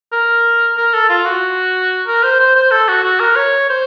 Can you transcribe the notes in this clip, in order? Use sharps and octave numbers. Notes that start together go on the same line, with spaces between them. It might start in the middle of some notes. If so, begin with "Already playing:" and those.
A#4
A#4
A4
F4
F#4
A#4
C5
C5
C5
A4
F#4
F#4
A#4
C#5
C5